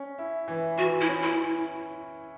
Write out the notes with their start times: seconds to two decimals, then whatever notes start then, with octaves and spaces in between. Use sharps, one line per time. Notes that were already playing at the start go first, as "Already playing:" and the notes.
Already playing: C#4
0.18 E4
0.48 E3
0.78 E3 F#4
1.01 E4
1.08 C#4
1.23 E4